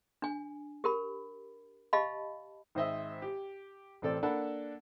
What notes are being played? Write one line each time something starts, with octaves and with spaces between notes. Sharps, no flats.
D4 G#5
G4 A#4 B5
G4 D#5 F5 A5 B5
G#1 C5 D#5 E5
G4
A1 C4 A4 D5
A#3 D4 A4 F#5 A5 B5